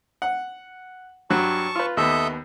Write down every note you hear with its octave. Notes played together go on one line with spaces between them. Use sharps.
F#5
G2 F#3 F#4 A5 C#6
F4 B4
D#2 B3 A4 D#5 E5